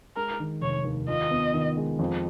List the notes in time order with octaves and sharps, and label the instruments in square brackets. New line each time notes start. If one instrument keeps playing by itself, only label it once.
[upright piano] G#3 [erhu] A#4
[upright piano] D#3
[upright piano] F1 [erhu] C#5
[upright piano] D#2
[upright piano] F4 [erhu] D#5
[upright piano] B3
D#3
G#3
F2